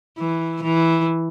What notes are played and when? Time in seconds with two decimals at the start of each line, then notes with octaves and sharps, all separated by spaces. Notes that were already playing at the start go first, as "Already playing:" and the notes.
0.18 E3
0.63 E3